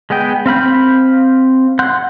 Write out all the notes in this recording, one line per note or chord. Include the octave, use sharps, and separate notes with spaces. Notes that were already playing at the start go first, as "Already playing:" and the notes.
G#3 B3 D#5 G5
C4 F5 B5 G6
F#5 C6 F#6 G6